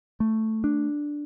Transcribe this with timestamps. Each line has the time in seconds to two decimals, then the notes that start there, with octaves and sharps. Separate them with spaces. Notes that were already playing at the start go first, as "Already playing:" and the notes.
0.20 A3
0.64 D4